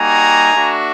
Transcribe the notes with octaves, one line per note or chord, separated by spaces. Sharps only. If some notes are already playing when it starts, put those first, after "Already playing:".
Already playing: G3 A#3 D#4 F#4 G#5 A#5
A3 D4 F#4